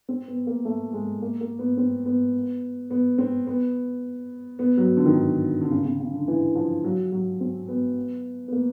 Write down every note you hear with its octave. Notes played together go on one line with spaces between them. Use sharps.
C4
B3
A#3
A3
G#3
A#3
A#3
B3
C4
B3
B3
C4
B3
B3
F#3
D3
D#3
D3
D3
C#3
C#3
C#3
D3
E3
F3
F#3
F#3
C4
B3
B3
A#3